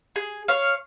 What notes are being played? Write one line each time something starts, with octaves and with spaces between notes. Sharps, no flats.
G#4
C#5 F5